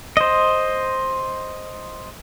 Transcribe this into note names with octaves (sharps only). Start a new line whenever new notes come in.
C5 D#5